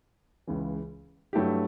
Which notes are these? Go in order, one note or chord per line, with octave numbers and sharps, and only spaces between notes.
C#2 C#3 E3
G2 F#3 A3 E4 G4